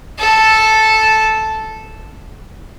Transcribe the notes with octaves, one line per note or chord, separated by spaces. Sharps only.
A4